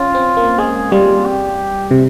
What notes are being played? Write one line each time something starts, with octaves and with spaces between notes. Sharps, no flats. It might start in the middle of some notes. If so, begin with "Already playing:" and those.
Already playing: C#4 F4
C4
A#3
G#3 G#4
G3 F4
G4
C3